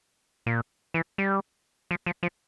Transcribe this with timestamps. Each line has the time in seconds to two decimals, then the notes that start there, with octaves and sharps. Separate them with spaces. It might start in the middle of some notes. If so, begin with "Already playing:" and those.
0.46 A#2
0.94 E3
1.18 G3
1.91 F3
2.06 F3
2.23 F3